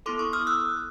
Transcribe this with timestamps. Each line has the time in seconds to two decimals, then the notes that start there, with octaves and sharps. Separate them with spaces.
0.06 B3 E4 A4 C6 D6
0.19 C#6 D#6
0.33 D#6 F6
0.47 E6 F#6